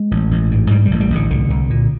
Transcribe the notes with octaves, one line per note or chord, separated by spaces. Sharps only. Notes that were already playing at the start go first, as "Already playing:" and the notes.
Already playing: G#3
A1
A1
G#2
G#2 G3
G3
A1
G3
A1 D3
C2 D3
C2
A#2